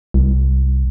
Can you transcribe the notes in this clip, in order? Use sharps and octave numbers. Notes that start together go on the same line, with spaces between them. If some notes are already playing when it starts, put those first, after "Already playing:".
C2